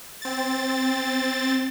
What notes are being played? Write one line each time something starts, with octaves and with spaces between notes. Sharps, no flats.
C4 A6